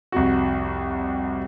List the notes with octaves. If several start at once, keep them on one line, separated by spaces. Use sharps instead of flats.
C2 F2 F#4